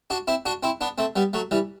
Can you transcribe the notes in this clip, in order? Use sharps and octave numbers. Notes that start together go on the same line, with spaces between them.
D4 F#4
C4 E4
D4 F#4
C4 E4
B3 D4
A3 C4
G3 B3
F#3 A3
E3 G3